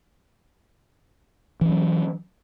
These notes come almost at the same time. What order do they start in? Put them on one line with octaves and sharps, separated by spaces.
E3 C#4 F#3